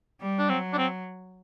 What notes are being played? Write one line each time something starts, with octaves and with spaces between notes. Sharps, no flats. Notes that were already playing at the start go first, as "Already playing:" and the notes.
G3
D4
F#3 C4
D4
C4